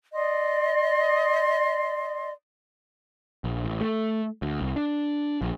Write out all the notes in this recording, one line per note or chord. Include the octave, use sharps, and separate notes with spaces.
D5 D#5 C6
A#1
A1
A3
D2
C2
D4
A#1